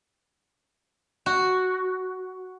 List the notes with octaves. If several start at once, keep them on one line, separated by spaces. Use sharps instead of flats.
F#4